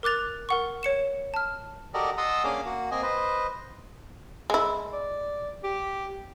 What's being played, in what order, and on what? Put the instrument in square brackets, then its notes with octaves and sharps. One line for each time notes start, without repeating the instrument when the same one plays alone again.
[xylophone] A#4 D6 F#6 A6 F7
A#4 F#5 C#6
C#5 C#7 E7
A5 F6
[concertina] F#4 G4 A4 A#4 D5 D#5
D#5 F#5 A5 C6 D#6 E6
A#3 C#4 D4 G#4 F5 D6
A#3 F#4
A#3 C4 D#5 G#5
B4 C5 D#5
[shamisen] G#3 E4
[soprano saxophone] D5
G4